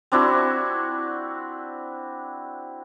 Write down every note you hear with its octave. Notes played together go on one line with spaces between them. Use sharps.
C4 D4 E4 F#4